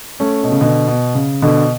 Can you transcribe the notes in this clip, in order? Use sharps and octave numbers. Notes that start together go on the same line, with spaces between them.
A3 C#4
B2
C#3
B2 D3
B2
C#3
B2 D3